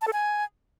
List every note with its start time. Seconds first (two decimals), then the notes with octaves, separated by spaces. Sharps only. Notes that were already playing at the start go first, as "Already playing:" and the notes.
0.02 A5
0.07 A4
0.13 G#5